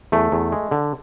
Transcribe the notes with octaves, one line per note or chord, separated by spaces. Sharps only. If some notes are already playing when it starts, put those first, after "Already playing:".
E2 A3
E2
G#3
D3